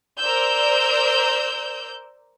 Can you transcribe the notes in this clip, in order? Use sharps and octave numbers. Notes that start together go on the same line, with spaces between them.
A#4 C5 D5 E6 G6